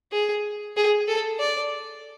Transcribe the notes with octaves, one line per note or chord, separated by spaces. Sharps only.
G#4
G#4
A4
D5